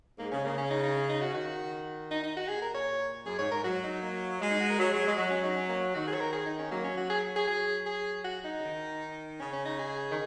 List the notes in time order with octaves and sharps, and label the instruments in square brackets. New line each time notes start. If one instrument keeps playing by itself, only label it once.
[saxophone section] G#2 [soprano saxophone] A#3
[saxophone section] C#3 [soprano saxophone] C#4
[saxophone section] C#3 [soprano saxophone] A#3
[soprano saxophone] C#4
D#4
D#4
C#4
D#4
F#4
[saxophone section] C#3
[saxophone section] D#3 [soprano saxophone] F#4
[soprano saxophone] D#4
D#4
F#4
[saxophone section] A#2 [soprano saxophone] G#4
[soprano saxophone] A#4
C#5
[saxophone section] F#2 [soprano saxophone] G#4
[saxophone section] G#2 [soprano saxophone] C#5
[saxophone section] G#2 [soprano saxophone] A#4
[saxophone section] F#3 [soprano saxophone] F#4
[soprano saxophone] D#4
A#3
[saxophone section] G#3
[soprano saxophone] D#4
F#4
A#4
[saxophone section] F#3 [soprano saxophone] G#4
[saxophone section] F#3
G#3
[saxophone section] F#3 [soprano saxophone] F#4
[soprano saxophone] C#4
D#4
C#4
A#3
[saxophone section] D#3 [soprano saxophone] F#4
[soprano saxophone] G#4
C#5
A#4
G#4
D#4
C#4
[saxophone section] F#3 [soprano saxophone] A#3
[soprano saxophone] C#4
F#4
G#4
G#4
[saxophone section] F#3 [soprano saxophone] G#4
[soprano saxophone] G#4
F#4
D#4
[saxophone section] C#3
D#3
[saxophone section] C#3 [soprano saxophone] C#4
[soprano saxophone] C#4
D#4
G#4
[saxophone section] D#3